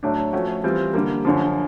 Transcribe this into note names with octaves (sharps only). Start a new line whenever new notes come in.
A2 F#3 A3 D4
F3 A3 C#4 F#4
E3 G3 C4 F4
D3 G3 A#3
F#2 D3 F3